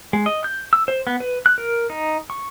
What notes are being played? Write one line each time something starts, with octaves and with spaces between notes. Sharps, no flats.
G#3
D#5
G6
E6
C5
B3
B4
F#6
A#4
D#4
C#6